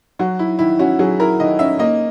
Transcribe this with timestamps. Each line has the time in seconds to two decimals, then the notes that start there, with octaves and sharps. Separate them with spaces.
0.19 F#3 F#4
0.39 E4
0.59 D#3 E4
0.79 C#4 F#4
0.99 F#3 G#4
1.20 E4 A#4
1.40 D#3 D#5
1.59 C#4 E5
1.79 A#3 D#5